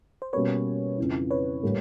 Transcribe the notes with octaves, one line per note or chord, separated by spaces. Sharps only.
C5
B2 G3 A#3 C#4 F#4 B4 C#5
F2 C#3 E3
B4 C#5
A2 E3 G3 A#3